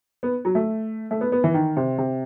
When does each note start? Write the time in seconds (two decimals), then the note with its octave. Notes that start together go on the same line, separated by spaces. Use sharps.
0.23 B3
0.45 F#3
0.55 A3
1.11 A3
1.21 B3
1.32 B3
1.44 E3
1.54 D#3
1.77 C3
1.98 C3